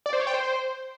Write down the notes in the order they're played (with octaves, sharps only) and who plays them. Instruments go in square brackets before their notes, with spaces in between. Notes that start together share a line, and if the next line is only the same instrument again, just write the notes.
[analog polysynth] D5
C5
C#5
G5
C5